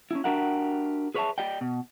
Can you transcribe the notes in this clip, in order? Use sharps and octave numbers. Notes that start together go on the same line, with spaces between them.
C#4 D4 E4
D4 F#4 G4 A#4 E5 F#5
G#4 B4 C#5 D#5 E5 A5
G4 D5 D#5 G5
B2